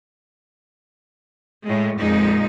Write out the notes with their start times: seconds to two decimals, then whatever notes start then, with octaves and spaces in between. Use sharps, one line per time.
1.66 A2 G#3
1.99 F2 A#2 G#3 D#4